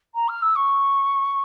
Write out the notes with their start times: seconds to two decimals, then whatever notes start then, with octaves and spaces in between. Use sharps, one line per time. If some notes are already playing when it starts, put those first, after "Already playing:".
0.14 A#5
0.28 F6
0.42 E6
0.56 C#6